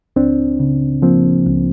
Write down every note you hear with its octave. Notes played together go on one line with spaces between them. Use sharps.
C#2 C4 D4
C#3
F3 A#3 C4
C#2